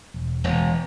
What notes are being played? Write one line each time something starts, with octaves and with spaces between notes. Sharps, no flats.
E1
E1